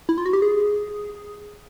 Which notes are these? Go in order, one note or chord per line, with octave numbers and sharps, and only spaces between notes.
E4
F4
F#4
G4
G#4